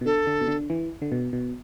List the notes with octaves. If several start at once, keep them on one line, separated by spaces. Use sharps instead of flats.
B2
D3 A4
D3
B2
D3
E3
D3
B2
B2